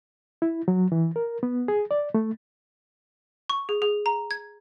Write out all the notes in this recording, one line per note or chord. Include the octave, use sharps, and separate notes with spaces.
E4
F#3
E3
A#4
B3
G#4
D5
A3
C#6
G#4
G#4
A#5
G#6